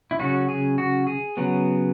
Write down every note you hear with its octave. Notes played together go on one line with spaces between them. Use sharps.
E4
C#3 F#3 C#4 F#4
G#4
F#4
G#4
C#3 F#3 B3